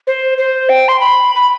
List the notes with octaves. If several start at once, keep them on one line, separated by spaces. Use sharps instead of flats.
C5
C5
G5
C6
B5
B5